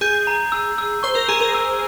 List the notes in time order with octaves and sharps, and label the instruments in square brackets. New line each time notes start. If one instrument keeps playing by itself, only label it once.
[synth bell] G#4 [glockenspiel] G6
[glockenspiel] A#5
E6
E6
[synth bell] C5 [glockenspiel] C#6
[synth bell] A#4
[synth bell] G#4 [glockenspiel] A#5
[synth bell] A#4
[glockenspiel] E6